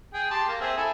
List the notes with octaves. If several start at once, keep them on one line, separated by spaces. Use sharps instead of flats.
G#4 G5
G4 A5 C6
A#3
C4 G#4 E5
E4 A4 G#5